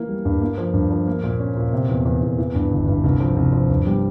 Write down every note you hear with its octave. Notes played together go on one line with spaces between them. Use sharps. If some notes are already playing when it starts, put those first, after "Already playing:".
Already playing: E3 A#3
G3
G2
A#3
F3
G2
F3
A#3
A#2
C#4
A#2
C3
E2
E2
E2
E3
G2
G1
G2
C2
F3
C2
F3
G2
G3